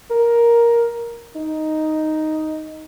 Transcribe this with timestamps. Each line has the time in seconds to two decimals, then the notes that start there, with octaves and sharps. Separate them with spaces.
0.11 A#4
1.36 D#4